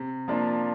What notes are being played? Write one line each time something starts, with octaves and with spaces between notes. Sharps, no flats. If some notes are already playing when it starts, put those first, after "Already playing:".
Already playing: C3
F3 A#3 D4 F4